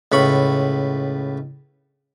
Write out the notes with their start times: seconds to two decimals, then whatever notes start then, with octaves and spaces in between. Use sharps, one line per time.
0.12 C#2 A2 B5 C#6